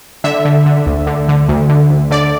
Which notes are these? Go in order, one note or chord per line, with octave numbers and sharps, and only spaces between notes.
D3 E5
D3
D3
D2
D3
D3
D2
D3
D2
D3 D5